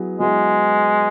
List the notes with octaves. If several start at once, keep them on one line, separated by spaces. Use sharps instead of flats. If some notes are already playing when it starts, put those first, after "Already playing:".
Already playing: F#3 B3 E4 G#4 B4
F#3 G#3 B3 E4 G#4 B4